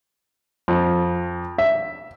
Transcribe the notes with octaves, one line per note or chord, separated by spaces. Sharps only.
F2
E5